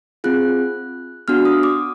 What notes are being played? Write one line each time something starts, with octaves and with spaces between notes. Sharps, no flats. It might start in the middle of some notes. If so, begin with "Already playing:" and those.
C4 F4 G#4 F#6
B3 D4 F#4 F6
D#6
D6